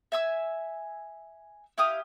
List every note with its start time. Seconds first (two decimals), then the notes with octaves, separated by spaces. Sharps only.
0.12 E5 G#5 E6
1.78 E4 G4 F5 D#6